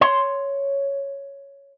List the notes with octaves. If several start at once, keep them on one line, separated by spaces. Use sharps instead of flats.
C#5 C6